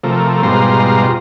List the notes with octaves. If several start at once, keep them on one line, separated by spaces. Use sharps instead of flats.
C3 F3 A3 A#4
G#2 B2 G3 F4 A#5 C6